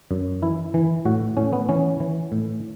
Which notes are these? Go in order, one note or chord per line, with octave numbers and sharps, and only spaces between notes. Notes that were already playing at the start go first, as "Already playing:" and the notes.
F#2
E3 E4
E3
A2 F#4
A2 C#4
B3
E3 C#4
E3
A2